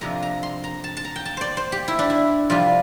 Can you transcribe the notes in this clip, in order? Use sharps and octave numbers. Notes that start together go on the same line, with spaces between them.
F2 C3 F3 A#3 D4 A#5
A#5
C6
A#5
A5
A5
A#5
G5
A5
C5 D5
C5
G4
E4
D4
E4
F2 C3 G3 D4 F4